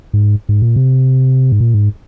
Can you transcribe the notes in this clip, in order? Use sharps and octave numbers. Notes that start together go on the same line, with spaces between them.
G#2
G#2
A#2
C3
G#2
A#2
G#2